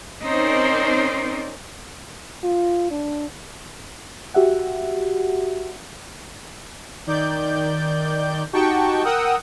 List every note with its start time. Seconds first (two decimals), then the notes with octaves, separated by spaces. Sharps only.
0.24 C4 C#4 D#4 A#4 C5 D5
2.44 F4
2.91 D4
4.34 F#4 G4 E5 F#5
7.07 D#3 D5 G6
8.53 D#4 F#4 G4 G5 A5 C#6
9.04 A#4 F#5 G5 D#6 E6